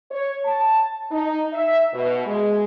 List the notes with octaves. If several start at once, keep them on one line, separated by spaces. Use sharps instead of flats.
C#5
A5
D#4
E5
B2
G#3